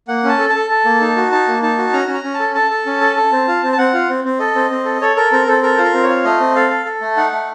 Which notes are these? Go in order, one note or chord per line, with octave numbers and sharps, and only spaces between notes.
A#3 F#5
C#4 A5
A4
A5
A4
A4
A#3
D#4
F#4
D#4 A5
A#3
D#4 A5
F#4
C#4 A#5
C#4
A#5
C#4
A5
A4
A4 A5
A4
C#4
A4
A4
C4
F4
C4
A5
C4 F#5
F4
C4
C4
A4 D#5
C4
C4
A4
A4 C#5
A4 A#4
C4 A#4
C4 A4
A4 A#4
F4 C5
A#4
C4
C#5
F4
A3 D#5
C4
A4 F5
A4
A4
A3
D#4 F#5
A3